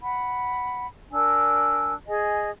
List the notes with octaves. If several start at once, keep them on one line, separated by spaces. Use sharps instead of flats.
F#5 B5
D4 A#4 G#5 E6
G#4 D#5 G#5